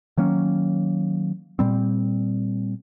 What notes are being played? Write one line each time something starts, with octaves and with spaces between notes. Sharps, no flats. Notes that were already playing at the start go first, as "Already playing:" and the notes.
D#3 F#3 A#3 C#4
A#2 G3 C4